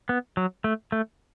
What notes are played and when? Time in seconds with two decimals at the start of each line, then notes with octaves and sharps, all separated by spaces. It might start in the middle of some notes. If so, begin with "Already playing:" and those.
0.09 B3
0.37 F#3
0.64 A3
0.92 A3